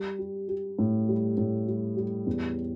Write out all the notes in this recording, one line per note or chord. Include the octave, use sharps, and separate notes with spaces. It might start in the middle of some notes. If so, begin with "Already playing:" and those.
Already playing: G3
G4
G4
A2
G3
A2
G3
G3
E2